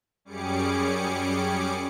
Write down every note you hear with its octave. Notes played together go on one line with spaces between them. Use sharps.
F#2 G3 C#4 G#4 D6 C#7